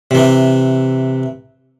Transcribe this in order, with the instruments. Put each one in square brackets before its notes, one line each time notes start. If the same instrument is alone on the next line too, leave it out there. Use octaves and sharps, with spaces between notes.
[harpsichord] C3 E3